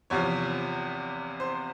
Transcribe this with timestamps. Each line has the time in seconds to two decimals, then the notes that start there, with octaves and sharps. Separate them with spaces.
0.10 E2 C3 F3 C#5
1.40 C5